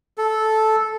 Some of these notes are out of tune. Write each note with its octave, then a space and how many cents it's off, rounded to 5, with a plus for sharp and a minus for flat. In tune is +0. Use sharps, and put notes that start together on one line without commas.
A4 -10